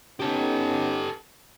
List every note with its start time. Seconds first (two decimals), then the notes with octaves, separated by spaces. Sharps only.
0.20 B3 C#4 D#4 G4 A4